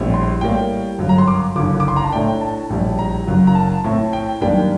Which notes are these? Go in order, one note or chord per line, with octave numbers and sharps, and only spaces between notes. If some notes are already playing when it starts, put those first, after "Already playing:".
Already playing: A#1 A2 G3 C4
C6
A2 G3 A#3 G5
G1 F#2 F#3
A#5
C6
D6
F#1 F#2 D3 D6
D6
C6
A#5
A5
A2 A3 D4 G5
A5
A#1 A2 G3
A#5
F#1 F#2 F#3
A#5
A5
A2 A3 C4
G5
F#2 D#3 G3 A#3 D4 G5